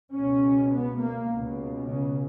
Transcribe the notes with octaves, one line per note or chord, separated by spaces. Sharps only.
C#2 B2 C#4
B3
A#3
C#2 B2
C#3